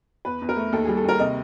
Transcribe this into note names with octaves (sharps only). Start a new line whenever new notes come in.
E2 B4
E2
A#4
A3
D#2 A4
G3 G#4
A4
D#2 A#4
C3 D#5